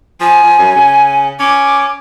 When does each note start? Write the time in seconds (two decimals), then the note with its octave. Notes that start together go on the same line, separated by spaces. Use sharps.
0.21 F3 G#5
0.44 F3
0.59 F#2
0.76 C#3
1.40 C#4 D6